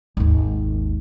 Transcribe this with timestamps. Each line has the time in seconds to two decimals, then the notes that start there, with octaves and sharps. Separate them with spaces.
0.17 G#1 D#2